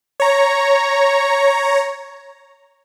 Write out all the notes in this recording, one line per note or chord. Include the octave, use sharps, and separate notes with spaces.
C#5 A#5